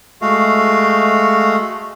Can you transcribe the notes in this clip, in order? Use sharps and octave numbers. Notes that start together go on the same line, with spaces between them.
G#3 A3 F#4 F5